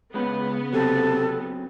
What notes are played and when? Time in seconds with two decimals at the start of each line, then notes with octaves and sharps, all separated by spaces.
0.14 C#3 G#3 B3 C#4 B4
0.73 C3 F#3 C4 C#4 A4